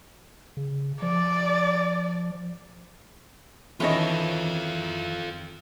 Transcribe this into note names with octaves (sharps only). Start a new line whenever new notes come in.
C#3
F3 D5
D#3 E3 C#4 F4 A4 B4 C#5 D#5